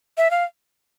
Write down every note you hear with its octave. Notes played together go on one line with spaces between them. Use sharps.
E5
F5